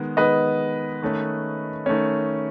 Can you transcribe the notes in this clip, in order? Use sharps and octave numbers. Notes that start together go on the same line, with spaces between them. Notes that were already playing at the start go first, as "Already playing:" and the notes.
Already playing: D#3 G#3 B3
D#3 G#3 B3 B4 D#5
D#3 A3 C#4
D#3 A3 C#4